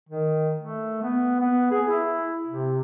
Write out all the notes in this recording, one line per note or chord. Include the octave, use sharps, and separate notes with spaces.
D#3
A3
B3
B3
G#4
E4
C3